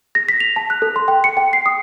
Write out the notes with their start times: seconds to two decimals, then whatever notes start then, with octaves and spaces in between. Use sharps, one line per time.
0.15 A#6
0.29 B6
0.40 F7
0.56 A5
0.70 F#6
0.82 A4
0.96 C6
1.08 G5
1.24 C#7
1.37 G5
1.53 C7
1.66 D#6